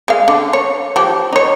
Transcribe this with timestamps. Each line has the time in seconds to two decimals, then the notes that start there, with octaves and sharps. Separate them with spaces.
0.08 G#3 F5
0.28 D3
0.53 C#5
0.96 F3 G4
1.33 D#4 C#5